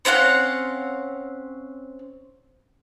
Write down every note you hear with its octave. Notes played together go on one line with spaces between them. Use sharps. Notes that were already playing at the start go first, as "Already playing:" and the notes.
C4 C#4 F5 F#5